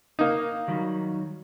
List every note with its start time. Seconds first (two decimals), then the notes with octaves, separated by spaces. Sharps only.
0.19 A#3 D#4
0.68 D#3 F#3 G3